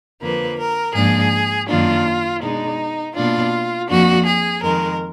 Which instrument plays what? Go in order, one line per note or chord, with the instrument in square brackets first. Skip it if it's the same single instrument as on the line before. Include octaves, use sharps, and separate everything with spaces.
[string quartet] F2 D3 F3 A#3 B4
A#4
G#2 F3 A#3 D4 G#4
F#2 D#3 A#3 D4 F4
B2 G#3 D4 D#4
B2 A#3 D4 F4
F2 F3 A#3 D4 F#4
G#4
F2 D#3 G#3 A#4